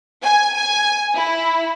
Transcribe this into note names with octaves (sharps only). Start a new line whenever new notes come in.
G#5
G#5
E4